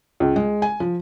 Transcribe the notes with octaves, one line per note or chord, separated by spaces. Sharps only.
C#2
G#3
G#5
F3